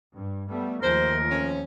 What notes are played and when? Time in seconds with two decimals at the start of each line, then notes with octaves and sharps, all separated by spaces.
0.13 G2
0.49 G3 A3 B3
0.82 D#2 F3 G#3 A3 A#4 C5
1.29 F2 C#4